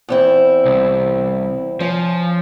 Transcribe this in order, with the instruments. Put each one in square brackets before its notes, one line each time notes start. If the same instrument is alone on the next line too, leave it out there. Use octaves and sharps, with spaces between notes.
[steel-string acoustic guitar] E2 C4 E4
[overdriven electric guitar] C2
[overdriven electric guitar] F3 [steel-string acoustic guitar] C#4